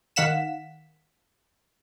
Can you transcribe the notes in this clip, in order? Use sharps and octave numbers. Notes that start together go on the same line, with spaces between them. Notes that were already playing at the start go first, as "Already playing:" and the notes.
D#3 F5 F#5 B6 E7